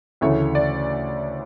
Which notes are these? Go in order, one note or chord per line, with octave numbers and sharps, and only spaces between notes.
D2 C#3 E3 A3 C#5
D5